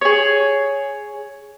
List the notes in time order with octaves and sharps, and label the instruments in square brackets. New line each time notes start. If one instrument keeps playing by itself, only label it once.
[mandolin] G#4 C#5